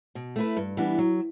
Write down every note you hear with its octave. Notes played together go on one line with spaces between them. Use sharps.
B2
A3 E4 B4
G2
E3 G3 B3 D4
F#3